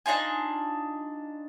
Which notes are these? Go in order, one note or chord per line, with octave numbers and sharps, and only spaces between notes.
D4 D#4 F4 G#5